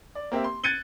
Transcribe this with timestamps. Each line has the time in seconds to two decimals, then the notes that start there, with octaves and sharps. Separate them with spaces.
0.15 D5
0.32 A#3 C4 G4 E5
0.44 C6
0.64 F#6 G#6 A6 C#7 D#7 G7